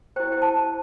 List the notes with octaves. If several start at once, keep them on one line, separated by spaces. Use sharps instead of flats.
E4 C5 G5
G5
A5